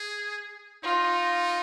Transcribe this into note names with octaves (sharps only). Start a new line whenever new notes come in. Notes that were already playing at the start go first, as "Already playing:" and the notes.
Already playing: G#4
D#4 F4